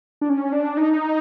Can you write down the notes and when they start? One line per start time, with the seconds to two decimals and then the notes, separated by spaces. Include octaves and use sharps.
0.21 D4
0.30 C#4
0.53 D4
0.77 D#4